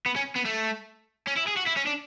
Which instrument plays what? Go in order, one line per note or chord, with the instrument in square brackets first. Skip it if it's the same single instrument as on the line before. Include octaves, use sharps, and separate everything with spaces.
[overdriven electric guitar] B3
C#4
B3
A3
C#4
E4
G#4
F#4
E4
C#4
D4